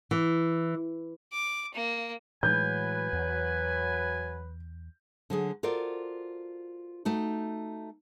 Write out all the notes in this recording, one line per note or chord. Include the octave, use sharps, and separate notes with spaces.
E3
D6
A#3
A2 E3 F#3 G#3 B4 G#5 G6
E2
D3 F#3 G#4
F4 F#4 A4 A#4 C5 D5
A3 D#4 F#4